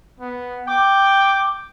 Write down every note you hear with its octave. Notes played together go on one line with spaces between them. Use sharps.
B3
G5 D6